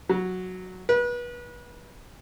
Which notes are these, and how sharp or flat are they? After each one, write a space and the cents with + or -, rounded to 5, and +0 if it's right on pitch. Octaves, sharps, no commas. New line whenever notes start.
F#3 -5
B4 -30